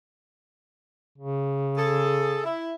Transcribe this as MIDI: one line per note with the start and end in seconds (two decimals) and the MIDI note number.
1.18 2.51 49
1.76 2.41 68
1.76 2.41 69
2.44 2.71 64